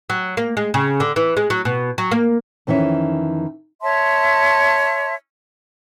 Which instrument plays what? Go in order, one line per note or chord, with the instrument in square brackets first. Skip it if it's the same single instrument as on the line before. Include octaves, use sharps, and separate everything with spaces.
[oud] F#3
A#3
G#3
C#3
D3
E3
G#3
F#3
B2
F#3
A#3
[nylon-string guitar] F2 D#3 E3 C#4 E5
[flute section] C#5 E5 A5 C6